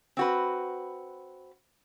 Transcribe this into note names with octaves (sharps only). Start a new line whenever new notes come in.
C4 F#4 B4